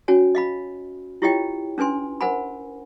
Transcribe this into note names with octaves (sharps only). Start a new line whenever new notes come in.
C#4 F#4 C#5 G#5
D#5 F5 B5
E4 F4 G4 C#5 D#5 G5
C#4 D4 B4 G#5 C6
A#4 C5 F#5 G#5 B5